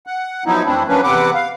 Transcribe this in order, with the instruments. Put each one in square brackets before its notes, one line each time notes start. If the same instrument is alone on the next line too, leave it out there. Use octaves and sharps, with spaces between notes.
[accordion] F#5
F3 F#3 B3 D#4 E4
F2 E3 A3 C4 D4 E4
F3 F#3 A#3 C#4 D4 B4
E2 C3 C4 B4 F#5 D6
F5